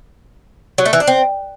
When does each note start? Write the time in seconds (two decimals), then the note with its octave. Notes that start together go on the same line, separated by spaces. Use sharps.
0.78 F#3
0.86 A3
0.93 E3
1.00 D4
1.07 C4